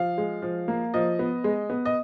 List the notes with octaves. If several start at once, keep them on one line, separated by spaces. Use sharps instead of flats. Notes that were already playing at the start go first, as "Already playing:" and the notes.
Already playing: F3 F5
G#3
F3
A#3
F3 D#5
B3
G#3
B3
D#5